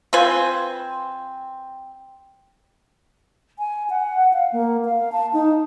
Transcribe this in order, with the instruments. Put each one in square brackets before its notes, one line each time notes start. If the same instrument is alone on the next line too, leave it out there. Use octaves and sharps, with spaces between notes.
[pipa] C4 F4 B4 G#5
[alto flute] G#5
F#5
F5
A#3
F5
A5
D#4